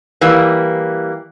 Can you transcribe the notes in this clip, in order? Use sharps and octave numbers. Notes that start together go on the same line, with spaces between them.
E3 G3 A#3